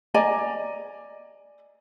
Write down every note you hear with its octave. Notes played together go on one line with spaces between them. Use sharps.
D5 D#5 G#5 A#5